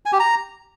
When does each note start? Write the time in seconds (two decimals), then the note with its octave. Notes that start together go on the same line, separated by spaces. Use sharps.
0.06 G#5
0.13 G4
0.20 A#5